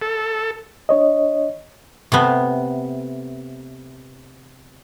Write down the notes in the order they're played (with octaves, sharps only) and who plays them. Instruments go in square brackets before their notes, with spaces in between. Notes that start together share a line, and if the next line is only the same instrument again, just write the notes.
[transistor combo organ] A4
[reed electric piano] D4 C#5 D#5
[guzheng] C3 A3 B3